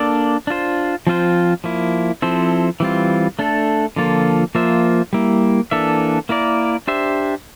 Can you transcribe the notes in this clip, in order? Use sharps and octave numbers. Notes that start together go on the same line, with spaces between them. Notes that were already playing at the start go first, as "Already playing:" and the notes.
Already playing: A#3 D4 A4 D5
D4 F4 C5
F3 C4 F4 C5
F3 A#3 E4
F3 C4 E4 A4 C5
E3 G3 C4 F4
A3 D4 A4
D3 F3 A#3 F4 A4
F3 A#3 F4 C5 E5
G3 A#3 E4
E3 A#3 D4 A4 E5
A#3 E4 A#4 D5
D4 G4 C5 E5